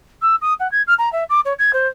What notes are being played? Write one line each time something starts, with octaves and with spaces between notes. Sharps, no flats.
E6
D#6
F#5
G#6
F6
A#5
E5
D6
C#5
G#6
C5